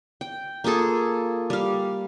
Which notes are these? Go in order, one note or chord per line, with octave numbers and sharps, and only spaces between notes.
G5
A#3 F4 G#4 A4
G3 F5